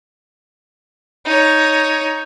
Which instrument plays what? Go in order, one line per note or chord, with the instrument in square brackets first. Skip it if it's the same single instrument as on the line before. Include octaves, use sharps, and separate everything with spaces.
[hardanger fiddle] D#4 C#5